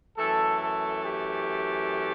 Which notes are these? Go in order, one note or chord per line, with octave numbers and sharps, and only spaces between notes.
F#2 E3 A3 A4
A4
G4